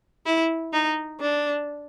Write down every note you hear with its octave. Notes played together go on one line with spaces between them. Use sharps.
E4
D#4
D4